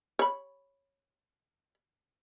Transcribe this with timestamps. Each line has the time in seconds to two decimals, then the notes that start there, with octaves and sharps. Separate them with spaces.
0.19 C#5 B5